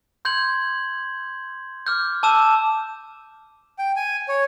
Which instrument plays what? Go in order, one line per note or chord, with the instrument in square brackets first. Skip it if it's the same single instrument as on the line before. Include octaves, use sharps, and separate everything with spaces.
[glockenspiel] C6 G6 G#6 F#7
D6 F6 G6
A5 D6 E6 E7
[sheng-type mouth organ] G5
G#5
C#5